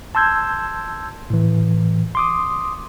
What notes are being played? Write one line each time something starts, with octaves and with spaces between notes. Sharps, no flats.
A5 C6 E6 G6 G#6
A2 E3
C6 D6 D#6